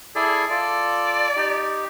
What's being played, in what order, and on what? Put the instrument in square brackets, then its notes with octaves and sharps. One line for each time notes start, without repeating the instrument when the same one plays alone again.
[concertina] E4 A4 D5 [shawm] G#4
[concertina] F4 A4 [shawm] D5
[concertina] D#4 G4